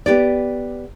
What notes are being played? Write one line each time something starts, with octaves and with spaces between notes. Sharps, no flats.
B3 G4 D5